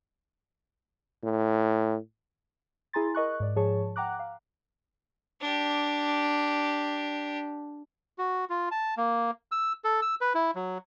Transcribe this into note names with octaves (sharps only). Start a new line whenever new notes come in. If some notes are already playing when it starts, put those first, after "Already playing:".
A2
E4 G#4 G#5 A#5 C6 A6
A#4 D#5 C#6 F#6
G#2 D5
G#2 F3 G#4 C#5 A5 C#6
F#5 G5 A#5 D6 F#6
F5
D4 G4
F#4
F4
A5
A#3
E6
A4
E6
B4
E4
F#3